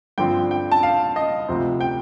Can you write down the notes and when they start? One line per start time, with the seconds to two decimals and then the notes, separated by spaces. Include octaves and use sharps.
0.18 G2 D3 F3 C4 G5
0.51 G5
0.72 A5
0.83 F5
1.16 D#5
1.48 D2 C3 F3 C4
1.81 G5